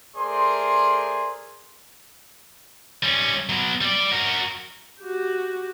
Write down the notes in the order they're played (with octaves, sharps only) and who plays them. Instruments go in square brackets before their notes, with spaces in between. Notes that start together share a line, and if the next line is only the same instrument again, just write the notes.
[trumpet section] A3 G#4 A#4 C5 D5 C6
[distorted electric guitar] G3 C#4
F#3 B3
G3 D5
F#4 A#4
[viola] F#4 G4